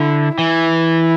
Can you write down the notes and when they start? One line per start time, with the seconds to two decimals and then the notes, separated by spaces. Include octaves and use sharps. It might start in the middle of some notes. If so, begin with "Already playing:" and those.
Already playing: D3 E4
0.38 E3 E4